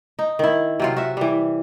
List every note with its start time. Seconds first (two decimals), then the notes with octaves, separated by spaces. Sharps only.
0.19 D#4
0.39 D#3 E4
0.80 C3 F#3 F4
0.97 F#4 E5
1.17 E3 G3